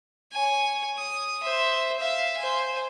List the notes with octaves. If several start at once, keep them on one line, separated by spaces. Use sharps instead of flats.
C#5 G#5
D#6
C5 E5
E5 F5
C5 G#5